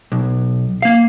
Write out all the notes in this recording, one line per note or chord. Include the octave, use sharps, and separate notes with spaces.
B1
A#3 F5